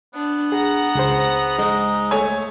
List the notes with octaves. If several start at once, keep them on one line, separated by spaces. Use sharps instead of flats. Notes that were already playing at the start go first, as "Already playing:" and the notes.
B3 D4
G#4 F#5 A#5
C#2 G#4 C5
G#3 D#4
A3 C#5 G#5